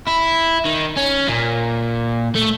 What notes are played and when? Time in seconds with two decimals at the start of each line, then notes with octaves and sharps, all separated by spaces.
0.07 E4
0.66 D#3
0.97 C#4
1.28 A#2
2.35 A3